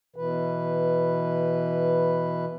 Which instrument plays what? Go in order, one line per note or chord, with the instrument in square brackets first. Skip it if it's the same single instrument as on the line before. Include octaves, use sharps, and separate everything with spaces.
[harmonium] B2 E3 B4